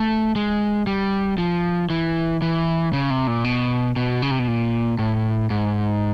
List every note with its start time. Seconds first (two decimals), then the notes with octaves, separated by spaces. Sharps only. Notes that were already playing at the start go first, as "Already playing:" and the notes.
Already playing: A3
0.36 G#3
0.87 G3
1.38 F3
1.90 E3
2.42 E3
2.93 C#3
3.10 C3
3.27 A#2
3.44 B2
3.96 B2
4.22 C#3
4.31 C3
4.39 B2
4.48 A#2
4.99 A2
5.50 G#2